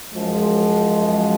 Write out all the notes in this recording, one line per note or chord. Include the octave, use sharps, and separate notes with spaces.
F#2 F3 G#3